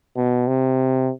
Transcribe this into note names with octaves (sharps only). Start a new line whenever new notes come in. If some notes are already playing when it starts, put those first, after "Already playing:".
B2
C3